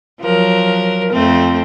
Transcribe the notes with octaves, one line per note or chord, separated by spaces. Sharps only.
F3 F#3 A#4
F2 A3 C4